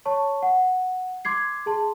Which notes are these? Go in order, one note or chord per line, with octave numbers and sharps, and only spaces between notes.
C#5 A5 C#6
F#5
C6 D6 G#6 C7
G#4 A5 C6